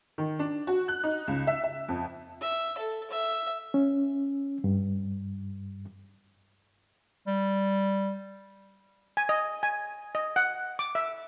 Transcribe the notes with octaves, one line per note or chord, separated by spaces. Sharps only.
D#3
D4
F#4
F#6
D#4
C#2
E5
E5
F2
E5
A4
E5
C#4
G2
G3
G#5
D#5
G#5
D#5
F#5
D6
E5